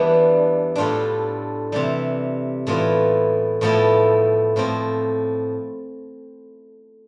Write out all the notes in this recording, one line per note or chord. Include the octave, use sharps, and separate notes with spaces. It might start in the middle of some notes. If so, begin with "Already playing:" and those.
Already playing: E2 E3 G3 B3 D4
A2 G3 D4 F4 A4
C3 E3 G3
A2 E3 B3 F4
A2 F3 B3 E4 A4
A2 F3 C4